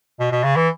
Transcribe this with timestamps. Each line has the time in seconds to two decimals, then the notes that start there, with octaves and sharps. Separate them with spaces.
0.20 B2
0.31 B2
0.44 C#3
0.56 E3